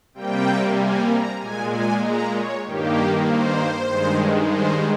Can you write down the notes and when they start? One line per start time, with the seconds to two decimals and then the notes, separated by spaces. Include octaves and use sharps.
0.14 C3 G3 A#3 G5
0.77 G#5
1.08 A#5
1.39 A#2 G#3 G#5
1.71 G#5
2.02 A#5
2.32 C#5
2.63 G2 D#3 A#3 G4
3.26 C5
3.89 G2 D#3 G#3
4.51 C5